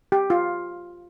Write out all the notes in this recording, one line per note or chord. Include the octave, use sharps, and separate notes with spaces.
G4
F4